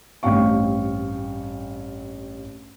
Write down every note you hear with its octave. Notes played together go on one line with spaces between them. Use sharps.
A1 G2 C4 F5 C#6